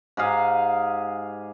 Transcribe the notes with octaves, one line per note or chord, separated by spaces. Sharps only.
G#2 G4 G#4 F5